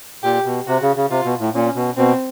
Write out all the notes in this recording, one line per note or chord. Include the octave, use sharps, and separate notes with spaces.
A#2 G4
B2
C3 F#4
C#3
C#3
C3 F4
B2
A2
A#2 C#4
B2
B2 C4